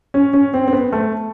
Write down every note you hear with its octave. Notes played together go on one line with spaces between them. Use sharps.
C#4
C#4
C4
C4
B3
A3